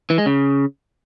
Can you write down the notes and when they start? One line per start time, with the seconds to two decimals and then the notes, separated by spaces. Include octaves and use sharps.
0.10 E3
0.18 G#3
0.26 C#3